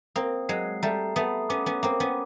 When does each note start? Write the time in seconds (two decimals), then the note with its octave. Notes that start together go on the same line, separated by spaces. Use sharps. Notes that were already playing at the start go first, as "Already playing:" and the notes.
0.16 A#3 C4 D#6
0.49 F#3 G#3 C7
0.83 G3 A3 A#5
1.16 A3 B3 D#6
1.49 B3 C#4 D6
1.66 B3 C#4
1.83 A#3 C4 D6
2.00 B3 C#4